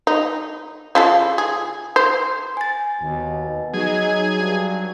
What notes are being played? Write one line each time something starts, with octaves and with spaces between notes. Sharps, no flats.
D#4
C#3 F4 A4
G#4
C5
G#5 A6
D#2 B2
F#3 D#4 G#4
G2